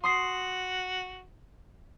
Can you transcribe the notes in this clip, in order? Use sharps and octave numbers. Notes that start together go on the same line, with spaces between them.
F#4 C6 D#6 C7